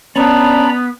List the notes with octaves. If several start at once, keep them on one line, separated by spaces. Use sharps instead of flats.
B3 C#4 D4 D5 A#5 B5